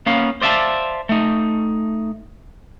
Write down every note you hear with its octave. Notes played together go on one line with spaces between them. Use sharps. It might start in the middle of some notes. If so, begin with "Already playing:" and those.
A#3 B3 C#4 F5
C5 D5 E5 F5 A5
A3 D#4